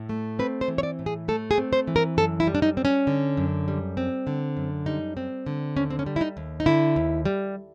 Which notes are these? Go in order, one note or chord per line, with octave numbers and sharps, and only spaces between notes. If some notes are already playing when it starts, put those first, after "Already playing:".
Already playing: A2
A3
C4 B4
C5
E3
C#5
D5
A2
G#4
A3 A4
G#4
C4
C5
E3
A#4
F#2 A4
E4
G3
D4
D#4
C4
C#4
D3
F#2
G3
C4
D3
F#2
G3 D#4
C4
D3
D#2 C#4
C4
C#4
G3
E4
D#4
D#2
D#4
D3 E4
D#2
G3